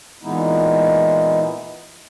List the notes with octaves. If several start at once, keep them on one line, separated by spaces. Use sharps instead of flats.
A#2 E3 G#3 B3 D#4 E4